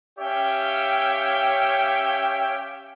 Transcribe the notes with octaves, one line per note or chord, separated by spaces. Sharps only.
C#4 G4 C#5 E5 F5 G5